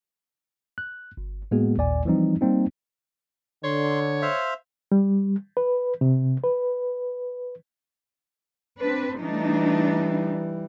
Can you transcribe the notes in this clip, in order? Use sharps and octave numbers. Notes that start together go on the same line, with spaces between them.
F#6
G1
A2 G#3 A#3 B3 F#4 G#4
A1 D#2 A#2 D5 G#5
E3 F3 G3 C4 D#4
G3 A#3 C4 D#4
D3 C#5 C6
C5 E5 F5
G3
B4
C3
B4
C4 D4 B4
E3 G3 A3 D4 D#4